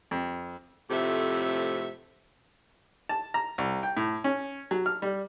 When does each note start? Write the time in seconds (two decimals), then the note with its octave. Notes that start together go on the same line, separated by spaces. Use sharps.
0.11 F2
0.90 F2 A2 C3 A3 A4 E5
3.09 A5
3.34 A#5
3.58 C2
3.83 G5
3.97 A2
4.24 C#4
4.71 F#3
4.86 F6
5.02 G3